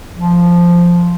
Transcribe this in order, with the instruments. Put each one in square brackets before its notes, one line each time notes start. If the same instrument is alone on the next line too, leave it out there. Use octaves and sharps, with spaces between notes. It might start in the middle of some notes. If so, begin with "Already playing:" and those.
[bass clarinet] F3